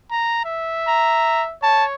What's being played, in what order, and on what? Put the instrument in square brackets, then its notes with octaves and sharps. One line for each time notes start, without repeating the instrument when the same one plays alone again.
[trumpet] A#5
E5
[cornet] A#5
[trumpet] C#5 [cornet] A5